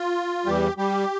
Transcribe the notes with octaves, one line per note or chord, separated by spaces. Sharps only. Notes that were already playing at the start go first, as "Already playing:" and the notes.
Already playing: F4
E2 E3 G3 G4
G3 G4